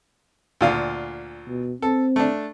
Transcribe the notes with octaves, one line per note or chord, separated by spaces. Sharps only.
D2 A#2 F5
B2
C4 A4
A3 D4